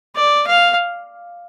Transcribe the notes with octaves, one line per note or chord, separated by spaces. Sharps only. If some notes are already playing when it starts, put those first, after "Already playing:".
D5
F5